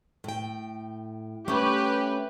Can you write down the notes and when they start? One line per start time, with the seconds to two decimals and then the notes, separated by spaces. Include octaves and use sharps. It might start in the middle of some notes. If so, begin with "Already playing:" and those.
0.24 A2 G5
1.48 A3 C#4 G4 B4